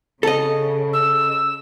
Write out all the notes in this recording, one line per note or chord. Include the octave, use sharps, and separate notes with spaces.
C#3 A4 D#5
E6